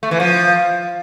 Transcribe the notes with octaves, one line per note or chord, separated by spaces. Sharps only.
A3
E3
F3